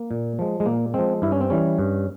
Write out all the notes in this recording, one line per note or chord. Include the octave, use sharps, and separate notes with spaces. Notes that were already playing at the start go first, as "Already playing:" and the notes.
Already playing: A#3
A#2
F3 G#3
G#3
A#2 A#3
F3 G#3 C4
G2 E4
C#4
C4
E3 G3 C#4
G2